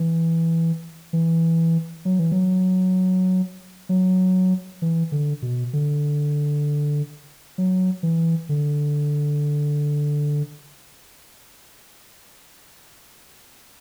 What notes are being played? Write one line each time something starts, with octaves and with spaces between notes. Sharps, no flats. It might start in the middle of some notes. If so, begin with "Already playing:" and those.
Already playing: E3
E3
F#3
E3
F#3
F#3
E3
D3
B2
D3
F#3
E3
D3